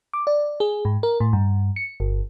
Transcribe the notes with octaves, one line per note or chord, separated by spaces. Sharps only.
D6
D5
G#4
G#2
A#4
A2
G2
C#7
G1